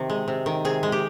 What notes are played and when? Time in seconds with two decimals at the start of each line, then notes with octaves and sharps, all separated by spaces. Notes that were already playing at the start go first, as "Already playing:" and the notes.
Already playing: C3 D#3
0.10 G#3
0.28 C3
0.46 D#3
0.65 C3 G#4
0.83 G#3
0.92 G4